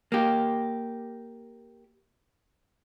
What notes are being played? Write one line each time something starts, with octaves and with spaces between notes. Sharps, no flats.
A#3 G4